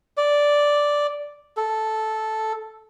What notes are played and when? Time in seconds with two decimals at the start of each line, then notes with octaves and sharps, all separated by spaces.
0.17 D5
1.57 A4